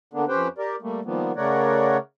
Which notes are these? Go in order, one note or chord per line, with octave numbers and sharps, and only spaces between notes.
D3 A#3 B3 D4
F2 C#4 G4 B4 C5 G5
G4 A#4 D5
G3 A3 A#3
D#3 F3 G3 A#3 B3
C#3 A3 A#4 C#5 D5 F#5